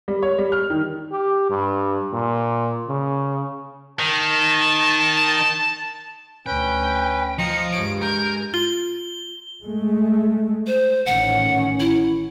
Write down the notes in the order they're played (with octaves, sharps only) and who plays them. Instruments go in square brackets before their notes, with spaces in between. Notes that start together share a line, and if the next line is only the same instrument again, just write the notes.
[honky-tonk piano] G3
C#5
G3
F6
D#3
[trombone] G4
G2
A#2
C#3
[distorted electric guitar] D#3 [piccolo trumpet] A5
[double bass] D2 [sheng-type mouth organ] C#4 B4 [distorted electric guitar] G5
[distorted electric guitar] F3 [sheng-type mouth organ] D#5 A#5 D#6 [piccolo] C#7
[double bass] G2 G#3 [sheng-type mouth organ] C#5 [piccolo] D7
[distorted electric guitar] A#4 [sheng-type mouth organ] G#5 [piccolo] G6
[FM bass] F4 [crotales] G7
[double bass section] G#3 A3
[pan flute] C5
[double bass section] A1 D#3 C#4 [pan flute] F#5
[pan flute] E4